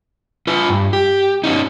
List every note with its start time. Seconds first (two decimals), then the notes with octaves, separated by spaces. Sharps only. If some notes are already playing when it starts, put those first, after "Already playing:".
0.47 F4 B4
0.69 G2
0.93 G4
1.44 B3 C#4 D#4